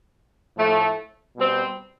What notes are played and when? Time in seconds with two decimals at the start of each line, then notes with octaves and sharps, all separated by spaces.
0.57 A2 F3 A3
1.37 B2 G3 C4